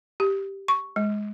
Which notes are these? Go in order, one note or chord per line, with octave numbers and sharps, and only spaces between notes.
G4
C#6
G#3